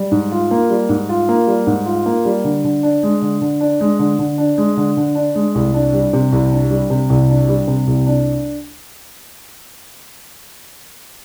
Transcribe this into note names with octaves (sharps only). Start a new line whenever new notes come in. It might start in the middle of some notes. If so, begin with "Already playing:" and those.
Already playing: G3
G#2
F4
A#3
G3
G#2
F4
A#3
G3
G#2
F4
A#3
G3
D3
D3
D4
G#3
D3
D3
D4
G#3
D3
D3
D4
G#3
D3
D3
D4
G#3
C2
D4
G3
C3
C2
D4
G3
C3
C2
D4
G3
C3
C2
D4